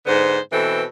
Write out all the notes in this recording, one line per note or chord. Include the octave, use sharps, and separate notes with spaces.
G#2 D3 B3 C5
B2 E3 C4 A4